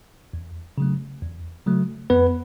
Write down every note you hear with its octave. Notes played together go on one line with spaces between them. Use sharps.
E2
C#3 F#3 A3
E2
C#3 F#3 A3
F2 B3 B4